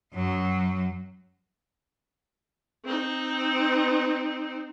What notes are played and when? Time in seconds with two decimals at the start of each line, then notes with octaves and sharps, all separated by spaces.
0.14 F#2 F#3
2.85 C4 D#4